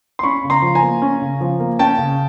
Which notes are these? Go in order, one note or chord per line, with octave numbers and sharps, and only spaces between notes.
C6
C#4 B5 C#6
C#3
A#5 C6
F3
G#5 A#5
A#3
C#4
C#3
F3
A#3
C#4 G5 A5
C#3